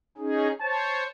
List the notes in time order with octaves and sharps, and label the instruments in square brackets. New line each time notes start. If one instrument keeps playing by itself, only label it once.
[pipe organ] C#4 D#4 G#4
[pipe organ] C5 C#5 [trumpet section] A5